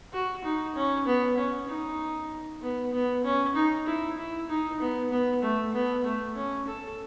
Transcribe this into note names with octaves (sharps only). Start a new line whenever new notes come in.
F#4
D#4
C#4
B3
C#4
D#4
B3
B3
C#4
D#4
E4
E4
D#4
B3
B3
A3
B3
A3
C#4
A4